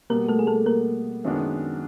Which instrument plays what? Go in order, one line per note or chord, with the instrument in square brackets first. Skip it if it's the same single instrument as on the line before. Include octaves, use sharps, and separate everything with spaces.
[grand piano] B2 G3 B3 [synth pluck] A#3 A#4
[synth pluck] A3 A4
G#4
A3 A4
A#3 A#4
[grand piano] F#2 D#3 G#3 B3 D4